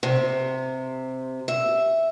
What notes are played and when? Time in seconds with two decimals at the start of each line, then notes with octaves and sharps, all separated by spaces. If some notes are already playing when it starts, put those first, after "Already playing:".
0.03 C3
1.48 E5